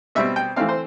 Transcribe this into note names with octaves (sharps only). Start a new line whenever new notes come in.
B2 G3 C4 E5
G5
E3 A3 C4 F5
C5